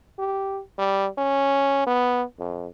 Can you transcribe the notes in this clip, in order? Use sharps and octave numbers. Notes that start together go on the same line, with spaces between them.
G4
G3
C#4
B3
F2